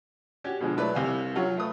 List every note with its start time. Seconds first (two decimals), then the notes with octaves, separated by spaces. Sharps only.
0.44 C#4 F#4 G4 C#5
0.61 B2 D3 F3 G#3
0.77 F#3 A3 E4 B4 D5
0.93 C2 C3 F5 G#5
1.36 F#3 C#4 F4
1.57 A3 B4 D#6